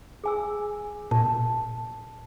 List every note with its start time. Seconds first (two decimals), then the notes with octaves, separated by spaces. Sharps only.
0.24 G#4 G#5 E6
1.11 A#2 A5